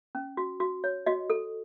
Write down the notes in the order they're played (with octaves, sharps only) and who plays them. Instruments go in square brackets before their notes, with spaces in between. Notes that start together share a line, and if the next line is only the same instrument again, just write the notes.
[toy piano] C#4
F#4
F#4
C#5
F#4 D#5
A4